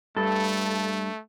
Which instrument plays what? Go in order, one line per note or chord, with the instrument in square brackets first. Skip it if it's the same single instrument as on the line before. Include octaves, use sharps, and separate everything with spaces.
[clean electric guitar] G2 [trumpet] A3 [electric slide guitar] A4